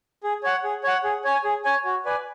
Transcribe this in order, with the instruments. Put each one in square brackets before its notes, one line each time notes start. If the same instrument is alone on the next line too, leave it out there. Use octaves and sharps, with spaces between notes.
[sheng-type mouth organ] G#4
C#5 F#5
G#4
C#5 F#5
G#4
C#5 G#5
G#4
C#5 G#5
F#4
B4 D5 G#5